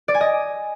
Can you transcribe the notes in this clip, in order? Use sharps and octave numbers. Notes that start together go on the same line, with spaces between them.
D5
G#5
D#5